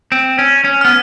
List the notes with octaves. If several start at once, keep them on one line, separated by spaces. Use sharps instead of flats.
C4
C#4
C#4
B3 F6